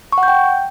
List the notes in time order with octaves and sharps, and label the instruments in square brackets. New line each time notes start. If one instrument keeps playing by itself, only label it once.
[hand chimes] C#6
F#5
G6
G5